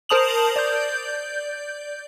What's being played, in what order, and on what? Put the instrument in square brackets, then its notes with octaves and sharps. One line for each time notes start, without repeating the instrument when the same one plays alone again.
[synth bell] A#4 C5 A5 D#6 F7 F#7
D5 G6